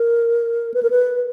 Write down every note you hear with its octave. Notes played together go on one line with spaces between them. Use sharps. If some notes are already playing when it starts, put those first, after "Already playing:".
Already playing: A#4
B4
A#4
B4